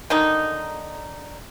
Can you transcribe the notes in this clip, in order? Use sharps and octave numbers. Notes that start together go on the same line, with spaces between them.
D3 D#3 D#4